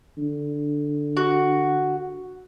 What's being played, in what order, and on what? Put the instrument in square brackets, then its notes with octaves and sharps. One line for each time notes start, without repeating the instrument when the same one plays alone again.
[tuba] D3
[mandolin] F#4